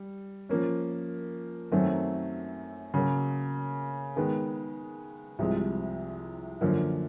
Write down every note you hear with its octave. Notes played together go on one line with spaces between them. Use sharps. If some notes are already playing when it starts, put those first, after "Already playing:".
Already playing: G3
F3 A#3 C#4
F#2 D#3 F#3 A3 C4
C#3 F#3 A#3
D#3 G#3 B3
C2 C3 F3 G#3
F#2 D3 F3 A#3